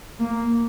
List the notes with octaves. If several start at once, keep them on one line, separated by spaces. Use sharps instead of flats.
A#3